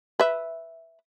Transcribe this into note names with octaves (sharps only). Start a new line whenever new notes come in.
B4 E5